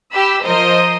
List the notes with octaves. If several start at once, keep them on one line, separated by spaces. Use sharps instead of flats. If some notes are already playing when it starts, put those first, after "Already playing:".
G4 B5 E6
F3 A#4 C5 D#5